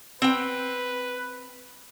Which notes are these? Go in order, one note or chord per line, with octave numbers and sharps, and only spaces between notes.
C4 B4 G5